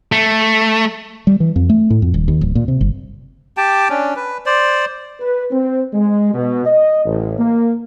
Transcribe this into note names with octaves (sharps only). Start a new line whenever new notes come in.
A3
G3
E3
F2
A3
A2
F2
D#1
D#2
D1
A#2
C3
G1
G4 G5 A5
C#4 D4
B4
C5 D5
B4
C4
G#3
B2
D#5
A1
A#3